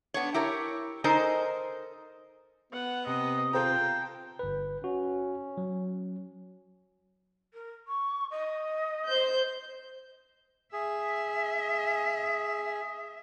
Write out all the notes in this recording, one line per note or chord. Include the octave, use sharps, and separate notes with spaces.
B3 D4 C#5
E4 G4 A#4 C#5
D#4 A4 A#4 C5 D#5 G#5
B3 F#5
C3 D#5
F4 A4 C5 G5 A#5
G1 B4
C#4 F#4
F#3
A#4
C#6
D#5
C5 G6
G#4 E5